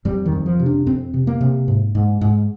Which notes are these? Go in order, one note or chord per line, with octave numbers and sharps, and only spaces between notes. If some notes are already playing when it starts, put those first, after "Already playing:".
F2 G3
D#3
F2
F3
C3
D4
F2 C4
C3
A#3
C3
G#2
G#2
G#2